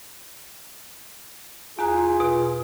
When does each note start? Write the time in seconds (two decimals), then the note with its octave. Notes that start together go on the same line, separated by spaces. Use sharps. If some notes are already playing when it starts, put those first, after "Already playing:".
1.79 E2 F4 G#4 A#5 F#6
2.20 B2